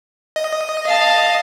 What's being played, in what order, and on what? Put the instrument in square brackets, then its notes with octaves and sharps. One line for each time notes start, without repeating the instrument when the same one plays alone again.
[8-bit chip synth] D#5
[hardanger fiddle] F5 A5